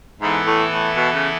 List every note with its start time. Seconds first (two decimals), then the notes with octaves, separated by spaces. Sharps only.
0.21 G#2 E3 B3 E4 A4
0.46 A2
0.72 A2
0.96 B2
1.14 C#3